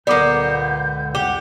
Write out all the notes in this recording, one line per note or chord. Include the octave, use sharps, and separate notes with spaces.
C#2 A#2 D3 A#3 B3 D5 D6 G6
C2 F2 G4 F#5